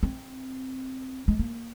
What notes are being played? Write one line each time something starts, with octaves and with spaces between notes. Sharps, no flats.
C4
G#3
A#3